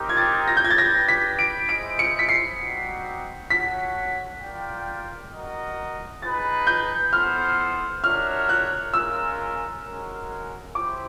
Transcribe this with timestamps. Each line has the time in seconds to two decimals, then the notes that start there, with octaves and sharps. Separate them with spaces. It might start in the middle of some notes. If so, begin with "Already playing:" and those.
Already playing: C4 D#4 G4 A#4
0.09 G#6
0.17 A6
0.48 A#6
0.57 G6
0.65 G#6
0.70 A6
0.78 D4 G4 B4 A#6
1.08 B6
1.39 D7
1.69 E4 G#4 C5 D#5 D7
1.99 C#7
2.19 B6
2.29 C7
2.59 G3 C4 D#4 F#4
3.50 F#4 A4 C#5 F#5 B6
4.40 F4 A#4 D5 G5
5.31 F#4 A#4 D#5
6.21 D#4 G#4 B4 A6
6.67 G6
7.12 B3 E4 A4 C5 F6
8.03 D4 F#4 A#4 C#5 E5 F6
8.49 F#6
8.94 G#3 C#4 F4 A#4 E6
9.84 G#3 C#4 F#4 A#4
10.75 E4 G4 C5 D6